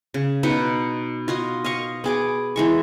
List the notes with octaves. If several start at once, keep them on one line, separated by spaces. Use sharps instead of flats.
C#3
B2 D#4 B4 F#5
F4 F#4 D#5
D#5 F5 C#6
B3 G#4 D6
E3 G#3 C#6